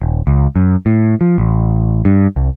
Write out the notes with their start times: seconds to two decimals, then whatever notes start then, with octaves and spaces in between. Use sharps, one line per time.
0.02 D#1
0.27 C#2
0.56 F#2
0.86 A2
1.21 F3
1.38 A1
2.05 G2
2.36 C2